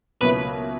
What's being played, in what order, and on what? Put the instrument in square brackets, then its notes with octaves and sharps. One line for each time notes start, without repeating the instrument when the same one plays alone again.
[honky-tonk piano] C#2 B2 F#3 A#3 E4 [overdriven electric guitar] B4